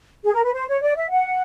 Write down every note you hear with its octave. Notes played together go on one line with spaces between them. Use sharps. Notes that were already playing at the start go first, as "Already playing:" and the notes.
G#4
A#4
B4
C5
C#5
D5
E5
F#5